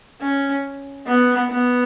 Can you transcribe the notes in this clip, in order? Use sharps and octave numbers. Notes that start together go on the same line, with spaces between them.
C#4
B3
B3